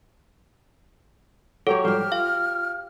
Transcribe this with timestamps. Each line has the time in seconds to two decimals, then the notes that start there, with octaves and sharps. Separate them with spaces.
1.67 F#3 G4 A4 C#5
1.85 G#2 F3 G3 G4 C5 F6
2.12 F4 F5